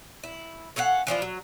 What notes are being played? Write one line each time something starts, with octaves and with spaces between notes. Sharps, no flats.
E4
C#4 A4 F5 F#5
E3 F3 D4 F4
F#3